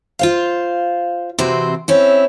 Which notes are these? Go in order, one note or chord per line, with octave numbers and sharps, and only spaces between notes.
F4 C5 F5
C3 E3 C4 F#4 C5
C4 C#4 E4